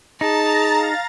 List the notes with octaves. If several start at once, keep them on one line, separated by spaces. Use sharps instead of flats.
D#4 G#4 A5 A#5 A6
F5 A#6